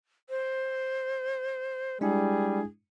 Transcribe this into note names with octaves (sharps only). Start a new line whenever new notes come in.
C5
G3 G#3 D4 E4 G#4